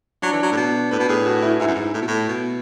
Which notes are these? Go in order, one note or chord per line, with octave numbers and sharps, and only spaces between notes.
F#3 D4
E3
F#3
A2
B2
A2 B4
B2
A2 G#4
F#4
E4
G#2 E4
F#2
G#2
A2
B2
A2
B2